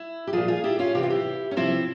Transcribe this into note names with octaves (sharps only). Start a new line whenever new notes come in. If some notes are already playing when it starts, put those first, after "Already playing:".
Already playing: E4
G4
A#2 F3 F4 G#4
F4 G#4
E4 G4
C#4 F4
C3 E3 G4
F4
E4 G4
C#4
C3 F3 C4 E4